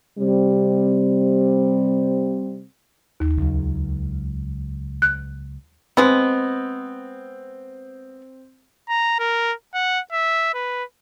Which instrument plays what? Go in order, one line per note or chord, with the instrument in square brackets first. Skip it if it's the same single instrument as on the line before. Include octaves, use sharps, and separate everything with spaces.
[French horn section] C3 G3 C4
[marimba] D#2
[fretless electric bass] C#2 F#3
[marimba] F#6
[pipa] G#3 B3 [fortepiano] C4
[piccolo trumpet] A#5
A#4
F#5
E5
B4